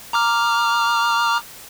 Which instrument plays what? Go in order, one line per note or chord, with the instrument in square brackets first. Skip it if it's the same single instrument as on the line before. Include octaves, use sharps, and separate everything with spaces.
[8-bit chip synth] A#5 D6 F6